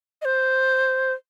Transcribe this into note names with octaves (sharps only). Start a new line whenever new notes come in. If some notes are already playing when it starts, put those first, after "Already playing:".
D#5
C5